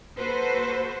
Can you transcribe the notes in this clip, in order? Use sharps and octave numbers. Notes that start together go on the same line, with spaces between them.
A#3 F#4 A4 B4 C5